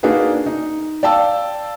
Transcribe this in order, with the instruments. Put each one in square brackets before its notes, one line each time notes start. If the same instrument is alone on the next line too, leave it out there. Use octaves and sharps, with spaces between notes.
[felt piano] A#3 D4 D#4 F#4 G#4 B4
D#4
D5 F5 G5 A5 E6